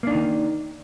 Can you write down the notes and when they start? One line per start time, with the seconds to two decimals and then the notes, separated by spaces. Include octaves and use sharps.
0.03 A#3
0.07 D4
0.11 D#4
0.15 D#3